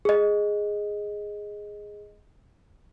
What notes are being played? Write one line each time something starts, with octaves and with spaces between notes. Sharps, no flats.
G#4 D#5